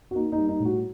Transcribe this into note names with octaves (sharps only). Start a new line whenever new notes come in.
F#4
A#3 D#4
D#4
G3
D#4
A2
F#4